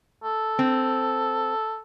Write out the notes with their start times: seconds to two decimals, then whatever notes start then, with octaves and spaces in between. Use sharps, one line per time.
0.24 A4
0.59 C4